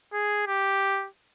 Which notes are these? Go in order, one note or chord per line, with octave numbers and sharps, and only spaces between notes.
G#4
G4